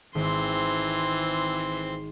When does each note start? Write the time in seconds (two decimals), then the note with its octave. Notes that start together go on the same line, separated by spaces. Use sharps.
0.15 G#1 E3 C4 C6